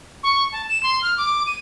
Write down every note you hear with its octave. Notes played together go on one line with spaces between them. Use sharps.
C#6
A5
E7
C6
F6
D6
D#7